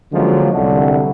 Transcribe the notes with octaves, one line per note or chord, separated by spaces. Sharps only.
D3 F3 F#3 G#3 A#3 C#4
C2 D3